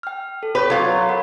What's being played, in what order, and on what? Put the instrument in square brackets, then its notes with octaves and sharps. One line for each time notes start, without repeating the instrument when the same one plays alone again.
[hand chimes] G5 F6
A4
[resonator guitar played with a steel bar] B4 [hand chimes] C#5 G6
[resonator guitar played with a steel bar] F#3 F4
[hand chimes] A#4 F#5 B5